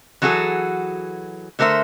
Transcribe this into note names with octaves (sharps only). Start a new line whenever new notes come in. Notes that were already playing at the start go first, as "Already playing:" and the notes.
E3 F#3 F#4 G#4 A4
D3 A3 A#4 C5 E5